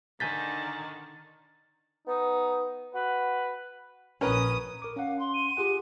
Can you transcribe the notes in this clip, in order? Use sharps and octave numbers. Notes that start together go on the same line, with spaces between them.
D3 D#3 G#5 G6 A6 B6
B3 D#4
F#4 B4
A#1 C#4 A#4 B4 D#6
A#4 D6
C#4 F5 F#5
C6
D#7
F4 G4 G#4 F#5